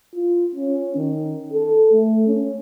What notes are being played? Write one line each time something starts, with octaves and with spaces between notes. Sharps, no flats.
F4
C#4
D#3
A4
A3
C#4